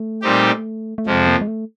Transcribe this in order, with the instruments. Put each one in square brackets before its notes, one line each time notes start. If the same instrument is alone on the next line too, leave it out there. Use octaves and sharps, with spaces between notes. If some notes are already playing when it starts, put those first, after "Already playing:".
Already playing: [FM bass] A3
[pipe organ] A#2 G3 C4 D#4 G4
[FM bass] A3
[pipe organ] F2 C3 F3 [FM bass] G#3
[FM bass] A#3
G#3
A3